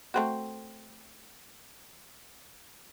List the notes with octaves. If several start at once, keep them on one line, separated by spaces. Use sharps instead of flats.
A3 C4 F#4